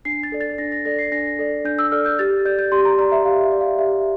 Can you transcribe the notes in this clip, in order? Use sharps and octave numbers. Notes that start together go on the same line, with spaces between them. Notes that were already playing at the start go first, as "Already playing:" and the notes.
D4 C7
A6
A4 D5
A6
D4 A#6
A#6
A4 D5 A#6
C7
D4 A#6
A4 D5
D4 G6
E6
A4 D5 F6
G6
G4 A6
D5 G6
G6
G4 C6
A#5
D5 A#5
E5
G4 F5
E5
D5
F5
G4 E5